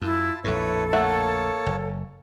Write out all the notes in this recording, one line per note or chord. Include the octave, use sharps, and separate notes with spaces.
F#2 E4 F4 A5
A#1 F2 A2 E4 A4 B4 C#5
A3 A#3 C#5 E5 F#5 A5
F#1